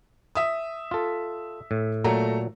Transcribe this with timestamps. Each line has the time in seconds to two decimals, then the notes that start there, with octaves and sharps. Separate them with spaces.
0.35 E5 D#6
0.91 F4 A4
1.71 A2
2.04 A#2 F#3 A3 A#5